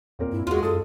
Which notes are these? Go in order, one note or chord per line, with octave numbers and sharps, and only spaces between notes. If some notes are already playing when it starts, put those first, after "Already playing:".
E2 A#2 C4 A#4
G2 E4
E2 G#3 F4 F#4
F#2 A4 D#6